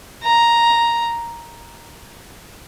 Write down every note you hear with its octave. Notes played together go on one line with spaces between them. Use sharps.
A#5